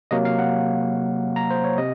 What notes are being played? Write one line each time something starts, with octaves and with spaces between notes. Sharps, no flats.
C3 F#3 A#3 D#5
F5
F#5
A#5
C5
C#5
C3 D#5